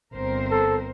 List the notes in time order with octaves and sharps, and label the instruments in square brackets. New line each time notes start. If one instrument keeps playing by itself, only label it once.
[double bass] G1 C4 [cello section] A#4 C5
[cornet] A4